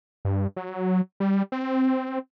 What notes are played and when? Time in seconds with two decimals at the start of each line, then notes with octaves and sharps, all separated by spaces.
0.25 G2
0.56 F#3
1.20 G3
1.52 C4